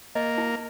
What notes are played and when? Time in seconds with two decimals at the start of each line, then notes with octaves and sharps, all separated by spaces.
0.15 A#3 D#5
0.38 E4